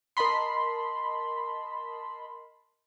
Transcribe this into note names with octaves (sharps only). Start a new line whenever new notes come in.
A#4 D#5 A5 B5 C6